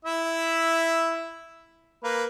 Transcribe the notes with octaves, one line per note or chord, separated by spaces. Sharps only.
E4 E5
A#3 B4